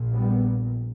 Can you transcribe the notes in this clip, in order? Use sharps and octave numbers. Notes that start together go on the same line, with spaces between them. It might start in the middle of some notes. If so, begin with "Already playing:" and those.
Already playing: A#1 A#2
G3 B3